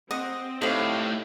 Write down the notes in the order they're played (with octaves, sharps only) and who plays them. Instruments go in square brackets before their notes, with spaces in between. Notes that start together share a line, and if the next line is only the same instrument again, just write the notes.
[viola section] C4 [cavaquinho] D#5 [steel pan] F#5
[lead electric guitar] A2 [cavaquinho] D#4 F5 [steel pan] G4 A4 C5